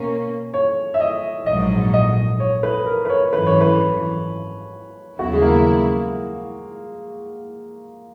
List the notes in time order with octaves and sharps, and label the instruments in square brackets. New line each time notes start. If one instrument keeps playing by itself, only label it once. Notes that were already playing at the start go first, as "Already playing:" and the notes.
Already playing: [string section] B2 A#3 C#4
[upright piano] C#5
E5
D#5
[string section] A#1 G#2 F#3 [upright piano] D#5
[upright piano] D#5
C#5
B4
A#4
B4
C#5
[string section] G#1 F#2 E3 [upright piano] B4
[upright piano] C#5
B4
[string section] D#2 C#3 F#3 B3 E4 [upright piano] F#4
[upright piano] G#3
A#3